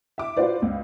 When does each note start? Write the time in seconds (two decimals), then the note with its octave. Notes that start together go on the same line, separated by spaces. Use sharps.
0.18 E5 D6
0.37 F4 F#4 B4 C5 D5
0.62 C#2